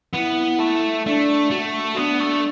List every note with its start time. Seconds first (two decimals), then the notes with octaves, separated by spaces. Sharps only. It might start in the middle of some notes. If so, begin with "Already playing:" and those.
0.14 B3 E4
0.60 A3
1.06 A3 D4
1.51 A3 F#4
1.97 B3 D4
2.20 A3